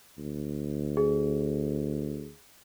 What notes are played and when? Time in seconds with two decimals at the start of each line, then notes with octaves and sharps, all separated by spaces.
0.18 D2
0.97 G#4